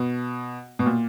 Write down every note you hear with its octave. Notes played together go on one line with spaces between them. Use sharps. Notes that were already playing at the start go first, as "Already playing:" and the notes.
Already playing: B2
B2
A#2